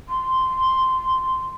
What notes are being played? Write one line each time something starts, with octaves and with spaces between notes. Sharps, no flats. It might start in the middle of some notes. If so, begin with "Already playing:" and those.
C6